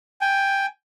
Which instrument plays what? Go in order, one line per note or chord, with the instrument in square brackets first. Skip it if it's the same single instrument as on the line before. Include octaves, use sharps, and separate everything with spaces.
[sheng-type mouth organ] G5 G#5